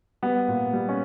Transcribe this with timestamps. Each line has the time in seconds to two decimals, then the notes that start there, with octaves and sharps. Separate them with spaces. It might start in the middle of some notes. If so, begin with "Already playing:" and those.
0.23 G3 B3
0.48 A#2
0.73 G3
0.89 C#4